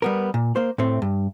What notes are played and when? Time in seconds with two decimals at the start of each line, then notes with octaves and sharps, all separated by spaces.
0.02 G3 B3 A#4
0.34 A#2
0.56 A#3 C5
0.78 A2 A3 C4
1.02 G2